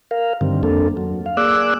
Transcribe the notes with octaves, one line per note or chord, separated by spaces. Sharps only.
A#4 F5
G2 D3 D#3 G3 C4
F2 A#3 C4 D4 A4
F#3
F5
A#3 G#4 D5 D6 E6 F#6